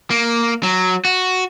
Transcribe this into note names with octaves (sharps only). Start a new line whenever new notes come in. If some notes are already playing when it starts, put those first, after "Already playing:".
A#3
F#3
F#4